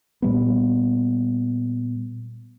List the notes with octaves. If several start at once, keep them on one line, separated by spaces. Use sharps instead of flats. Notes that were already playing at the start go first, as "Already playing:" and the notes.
A#2 G3 B3